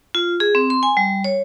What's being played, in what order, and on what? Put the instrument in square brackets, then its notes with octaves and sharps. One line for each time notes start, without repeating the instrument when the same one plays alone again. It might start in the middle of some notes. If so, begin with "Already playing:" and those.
[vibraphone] F4
G#4
C4
C6
G#5
G3
C#5